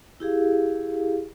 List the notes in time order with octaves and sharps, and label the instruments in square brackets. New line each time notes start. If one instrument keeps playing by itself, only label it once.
[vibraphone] E4 G4 G#4 F5